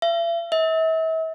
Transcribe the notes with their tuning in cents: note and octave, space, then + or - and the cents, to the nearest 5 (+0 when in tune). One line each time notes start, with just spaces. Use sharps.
E5 +45
E5 -40